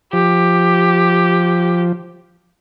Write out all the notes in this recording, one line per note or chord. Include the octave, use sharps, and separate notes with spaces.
F3 G4